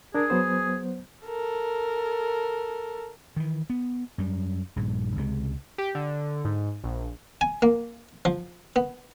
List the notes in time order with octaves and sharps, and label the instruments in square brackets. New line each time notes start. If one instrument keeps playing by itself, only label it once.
[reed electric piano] D4 A#4 [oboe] G#4
[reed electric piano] F#3 B3 C5
[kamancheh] A4 A#4
[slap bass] D#3 E3
B3
F#2 G3
A#1 G2 A#2
C#2 C3 G#3
[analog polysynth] G4
D3
G#2
A#1
[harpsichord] G#5
A#3
F3
B3